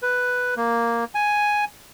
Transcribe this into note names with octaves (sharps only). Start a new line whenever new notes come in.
B4
A#3
G#5